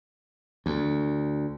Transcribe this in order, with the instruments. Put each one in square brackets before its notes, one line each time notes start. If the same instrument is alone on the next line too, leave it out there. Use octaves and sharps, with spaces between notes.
[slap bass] D2